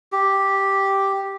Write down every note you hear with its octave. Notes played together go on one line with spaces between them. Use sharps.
G4